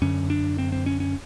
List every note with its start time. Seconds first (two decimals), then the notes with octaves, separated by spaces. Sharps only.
0.02 F#2 D3 C#4
0.30 D4
0.58 C4
0.72 C4
0.86 C#4
1.00 C#4